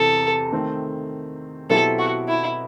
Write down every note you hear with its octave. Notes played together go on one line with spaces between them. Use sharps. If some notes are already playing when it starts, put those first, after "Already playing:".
Already playing: E2 C3 E3 C4 A4
D#3 A3 C4
B2 F#3 C4 E4 G4 A4
F#4
E4